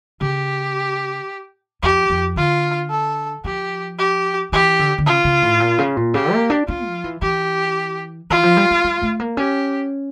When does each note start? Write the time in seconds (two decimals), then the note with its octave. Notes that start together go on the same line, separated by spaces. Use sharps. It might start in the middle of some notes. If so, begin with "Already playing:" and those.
0.21 C#3 G4
1.82 F2 G4
2.10 F2
2.36 D3 F4
2.90 A4
3.44 F3 G4
3.99 G4
4.52 E3 G4
4.79 D3
4.98 D3
5.06 C#3 F4
5.24 C#3
5.42 A2
5.60 A#2
5.78 C#3
5.97 A#2
6.14 C#3 G4
6.33 A#3
6.50 D4
6.68 D4 F4
6.86 F3
7.04 E3
7.22 E3 G4
8.30 E3 F4
8.43 F3
8.57 G3
8.71 G3
8.84 G3
9.02 A3
9.20 A#3
9.37 C#4 G4